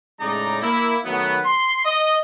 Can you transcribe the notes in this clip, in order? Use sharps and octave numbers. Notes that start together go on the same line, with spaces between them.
A2 C#3 G#3 D#4 D5 A#5
A#3 E4
D#3 F#3 A3 B3
C6
D#5